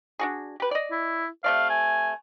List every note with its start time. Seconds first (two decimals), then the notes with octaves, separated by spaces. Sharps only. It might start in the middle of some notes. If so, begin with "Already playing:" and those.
0.19 D4 F#4 G#4
0.60 G4 B4
0.71 D5 D#5
0.91 E4
1.44 C3 A3 D5 F5
1.70 G#5